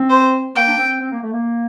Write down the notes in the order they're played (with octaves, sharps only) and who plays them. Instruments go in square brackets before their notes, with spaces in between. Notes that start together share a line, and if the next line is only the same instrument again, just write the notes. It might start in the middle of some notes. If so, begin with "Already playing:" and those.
Already playing: [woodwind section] C4
[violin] C5
[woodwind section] A#3 [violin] G5
[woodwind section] D4
C4
C4
A#3
A3
A#3